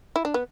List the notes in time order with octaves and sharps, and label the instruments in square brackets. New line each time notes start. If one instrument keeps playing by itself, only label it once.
[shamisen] E4
D4
B3